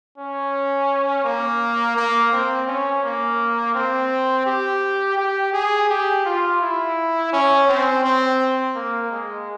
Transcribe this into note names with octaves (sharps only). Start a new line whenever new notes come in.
C#4
A#3
A#3
C4
C#4
A#3
C4
G4
G4
G#4
G4
F4
E4
C#4
C4
C4
A#3
G#3